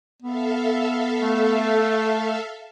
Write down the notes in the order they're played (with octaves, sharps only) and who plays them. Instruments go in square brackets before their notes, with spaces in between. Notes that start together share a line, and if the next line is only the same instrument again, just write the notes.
[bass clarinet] B3 [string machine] A4 E5 F5
[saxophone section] A3